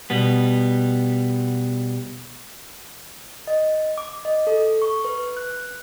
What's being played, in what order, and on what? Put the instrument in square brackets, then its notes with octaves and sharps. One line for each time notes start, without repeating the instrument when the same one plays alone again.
[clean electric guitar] B2 G3 B3
[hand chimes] D#5
D6
D#5
A4
C#6
B4
F#6